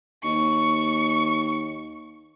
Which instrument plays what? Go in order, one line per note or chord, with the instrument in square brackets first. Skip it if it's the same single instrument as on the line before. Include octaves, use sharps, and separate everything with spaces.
[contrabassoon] D#2 [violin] C#6